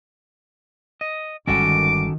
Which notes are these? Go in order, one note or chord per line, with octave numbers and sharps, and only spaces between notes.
D#5
G1 D#3 G3 G#3 C#4 F#4 A4 D6